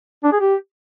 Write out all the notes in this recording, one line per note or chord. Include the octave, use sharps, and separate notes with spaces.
D4
G#4
G4